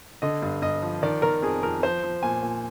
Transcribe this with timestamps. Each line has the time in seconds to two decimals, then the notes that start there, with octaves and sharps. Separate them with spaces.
0.22 D3 D#5
0.42 G2
0.62 G2 D#5
0.82 F3
1.03 D#3 D5
1.22 D#3 A#4
1.42 F2 G#4
1.63 F2 A#4
1.83 F3 C5
2.03 F3
2.23 A#2 G#5
2.43 A#2